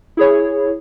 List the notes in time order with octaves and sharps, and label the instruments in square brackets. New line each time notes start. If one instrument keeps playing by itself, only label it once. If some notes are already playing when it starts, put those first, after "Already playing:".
[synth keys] E4 G#4 C#5